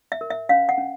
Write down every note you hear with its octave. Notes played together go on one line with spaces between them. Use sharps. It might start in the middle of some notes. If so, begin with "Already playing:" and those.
E5
A#4
E5
C#4 F5
F#5
C#4